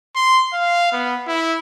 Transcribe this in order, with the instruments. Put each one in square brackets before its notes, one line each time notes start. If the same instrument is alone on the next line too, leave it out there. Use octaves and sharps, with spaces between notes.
[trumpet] C6
F5
B3
E4